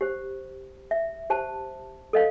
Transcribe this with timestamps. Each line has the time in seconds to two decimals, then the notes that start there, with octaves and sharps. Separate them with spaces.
0.01 G4 C5
0.91 E5
1.30 G4 C5 A5
2.13 A4 D#5 F5